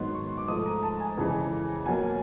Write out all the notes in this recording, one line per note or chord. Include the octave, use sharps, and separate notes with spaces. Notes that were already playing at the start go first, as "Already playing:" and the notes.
Already playing: G#2 D#3 F#3 B3 C6
C#6
D6
G#2 F3 A3 D#6
A#5
A5
G#5
F2 C#3 E3 G#3
B2 F#3 A#3 G#5